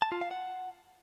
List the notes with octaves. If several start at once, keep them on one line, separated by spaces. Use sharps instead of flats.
A5
F4
F5
F#5